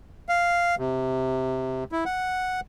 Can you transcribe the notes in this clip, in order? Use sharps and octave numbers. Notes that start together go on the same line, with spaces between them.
F5
C3
E4
F#5